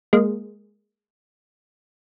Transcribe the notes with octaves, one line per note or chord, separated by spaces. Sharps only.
G#3 A#3